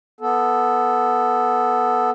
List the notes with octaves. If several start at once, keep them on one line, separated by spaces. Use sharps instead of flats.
B3 A4